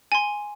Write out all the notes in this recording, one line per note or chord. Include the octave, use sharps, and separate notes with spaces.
G#5 C6